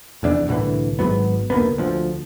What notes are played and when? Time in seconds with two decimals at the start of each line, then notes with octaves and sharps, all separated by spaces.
0.23 F1 E2 D4
0.48 C2 A2 D3 E3
0.99 G#1 G#2 F#3 B3
1.50 F1 D2 A#3 B3
1.78 D2 F3